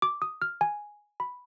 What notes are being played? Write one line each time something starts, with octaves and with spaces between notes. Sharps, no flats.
D6
D#6
F6
G#5
B5